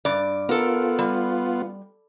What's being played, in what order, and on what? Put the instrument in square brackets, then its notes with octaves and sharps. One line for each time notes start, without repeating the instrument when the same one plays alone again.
[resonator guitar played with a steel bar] G2 D5
[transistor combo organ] B3 F4 [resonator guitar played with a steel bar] A4 A#4
[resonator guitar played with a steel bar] G3